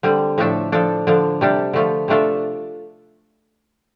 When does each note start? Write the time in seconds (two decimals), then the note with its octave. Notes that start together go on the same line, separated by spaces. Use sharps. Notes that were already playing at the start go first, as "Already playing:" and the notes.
0.03 D3 G3 C4
0.38 A2 F3 A3 D4 A4
0.72 F3 D4 A4
1.07 D3 F3 D4
1.41 C3 G3 D4 G4
1.73 D3 F3 A3 F4
2.08 C3 A3 D4 F4 A4